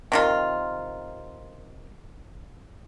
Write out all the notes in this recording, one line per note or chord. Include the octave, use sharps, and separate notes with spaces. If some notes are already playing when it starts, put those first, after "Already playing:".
C3 D#3 F4